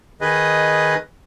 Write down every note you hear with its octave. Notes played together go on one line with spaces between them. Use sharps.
D#3 G#4 B4 D#5